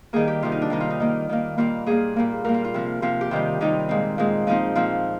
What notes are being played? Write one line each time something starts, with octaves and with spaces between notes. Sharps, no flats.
D#3 G3 A#3 G#4
G4
C3 D#3 G3 F4
D#4
D4
C3 D#3 G3 D#4
F4
D#4
D#3 A#3
D#3 A#3
A#2 G3 A#3 F4
A#2 G3 A#3 G#4
A#2 G3 A#3
A#2 G3 A#3 A#4
F4
F4
C3 F3 C4
C3 F3 C4 F4
G4
C3 D#3 G3 F4
C3 D#3 G3 D#4
A#2 G#3 C4
A#2 G#3 C4
A#2 F3 C4 D#4
A#2 F3 C4 F4